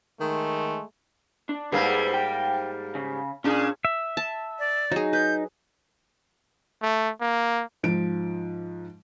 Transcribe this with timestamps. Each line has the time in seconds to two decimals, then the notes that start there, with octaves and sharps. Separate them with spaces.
0.21 D#3 G#3 A3
1.49 D4
1.72 G#2 G3 A#3 G#4 B4
2.14 G5
2.95 C#3
3.44 A#2 C#4 D4 G#4
3.85 E5
4.17 A5
4.59 D5
4.92 F#3 D#4 G#4
5.13 B4 G6
6.82 A3
7.21 A#3
7.83 G#2 F3 D7